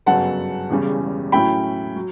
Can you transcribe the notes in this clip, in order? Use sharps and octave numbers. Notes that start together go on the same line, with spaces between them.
G1 F#2 C#3 F#3 B3 F#5 A5
E1 E2 C#3 G3 C#4
A2 F#3 C#4 E4 G5 B5
F#3